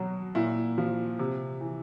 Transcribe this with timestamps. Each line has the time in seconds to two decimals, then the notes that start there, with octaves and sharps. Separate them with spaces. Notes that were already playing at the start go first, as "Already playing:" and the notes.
Already playing: B2 F#3
0.35 A#2 E4
0.78 F3
1.19 C3
1.61 E3